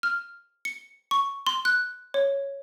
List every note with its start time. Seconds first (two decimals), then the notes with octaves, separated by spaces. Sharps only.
0.03 F6
0.65 C#7
1.11 C#6
1.47 C6
1.65 F#6
2.14 C#5